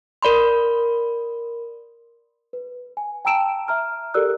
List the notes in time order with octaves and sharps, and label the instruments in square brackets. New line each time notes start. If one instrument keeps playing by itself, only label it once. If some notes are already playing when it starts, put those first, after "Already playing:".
[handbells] A#4 D5 B5 C6
[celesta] B4
G#5
G5 A5 A#5 E6 D7 E7
E5 A#5 F6
G4 A4 A#4 D5 E6 F#6